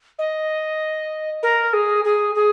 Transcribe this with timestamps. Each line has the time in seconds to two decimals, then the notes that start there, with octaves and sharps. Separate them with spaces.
0.18 D#5
1.43 A#4
1.73 G#4
2.04 G#4
2.35 G#4